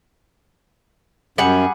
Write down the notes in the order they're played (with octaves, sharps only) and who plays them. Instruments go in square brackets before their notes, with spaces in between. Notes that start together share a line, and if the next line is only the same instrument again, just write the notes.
[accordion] F#2 [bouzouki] G3 G#4 F#5